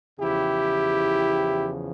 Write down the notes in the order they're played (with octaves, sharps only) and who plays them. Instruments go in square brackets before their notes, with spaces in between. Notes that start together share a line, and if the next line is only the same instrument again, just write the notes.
[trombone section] E2 C#3 F3 E4 G4